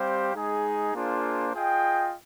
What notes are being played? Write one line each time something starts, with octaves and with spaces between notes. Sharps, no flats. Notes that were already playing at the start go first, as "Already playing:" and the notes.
Already playing: G3 C4 G4 C5 F5
G#3 D#4 G#4
A#3 D4 F4 G#4 C5
F4 G#4 D#5 G5